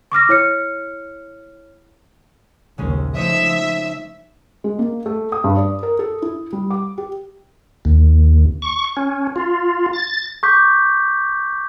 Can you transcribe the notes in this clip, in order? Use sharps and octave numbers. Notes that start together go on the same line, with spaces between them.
C#6 D6 F6 A#6
E4 C#5 F6 C#7
A#1 D#2 C#3 G#3 C#4
F3 A3 D#4 C#5 D#5 E5
G#3
A#3
A3
D#6
G2
D5
A#4
A4
E4
G3
D6
G4
D#2
C#6
C#4
F4
A6
C#6 D6 G6 B6